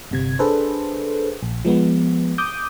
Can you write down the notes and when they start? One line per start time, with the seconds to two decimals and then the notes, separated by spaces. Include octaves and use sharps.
0.11 G1 C3 G#6
0.39 D4 G#4 A4 B4 C5
1.43 A#1
1.65 F3 G#3 B3
2.38 D6 D#6 G6